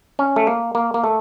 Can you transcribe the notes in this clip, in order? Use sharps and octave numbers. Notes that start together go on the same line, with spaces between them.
C#4
A3
A#3
A#3
A#3
A3